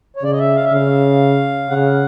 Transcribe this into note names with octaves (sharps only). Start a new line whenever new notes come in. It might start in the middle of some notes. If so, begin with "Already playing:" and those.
C#5
C#3 D5
D#5
E5
F5
E5
C#3 F5
C#3 F#5